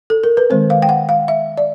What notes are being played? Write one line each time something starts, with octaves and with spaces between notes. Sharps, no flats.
A4
A#4
B4
D#3 G#3 C4 C5
F5
G5
F#5
F5
E5
D5